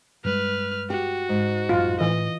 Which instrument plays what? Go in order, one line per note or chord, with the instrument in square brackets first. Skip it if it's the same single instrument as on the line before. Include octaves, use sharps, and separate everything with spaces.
[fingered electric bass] G2 G3 G#3 [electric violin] B4 F6
[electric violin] F#4 [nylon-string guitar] G4
[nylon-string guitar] G#2
[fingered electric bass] A1 F#2 [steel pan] F4
[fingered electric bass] A2 [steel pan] E3 [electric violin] D#5